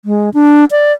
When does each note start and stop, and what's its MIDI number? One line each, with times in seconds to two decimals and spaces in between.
0.05 0.30 56
0.34 0.65 62
0.71 0.92 74